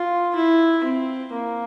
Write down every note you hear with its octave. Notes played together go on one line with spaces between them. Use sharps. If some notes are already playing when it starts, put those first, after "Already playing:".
Already playing: F4
E4
C4
A#3